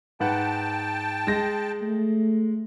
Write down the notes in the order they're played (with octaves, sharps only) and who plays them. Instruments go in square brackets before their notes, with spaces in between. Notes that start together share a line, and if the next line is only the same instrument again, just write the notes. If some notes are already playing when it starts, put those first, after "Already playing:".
[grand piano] G#2 B4 F#5 [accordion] G5 A5
[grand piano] G#3 A#6
[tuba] A3